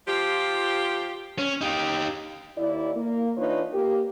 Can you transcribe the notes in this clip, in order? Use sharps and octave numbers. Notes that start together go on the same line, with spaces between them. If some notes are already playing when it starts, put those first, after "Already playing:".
F3 F4 G4
C#4
D#4 G4
D#2 E4 D5
A#3
E3 D4 D#4 F4 B4 C#5
A#3 G4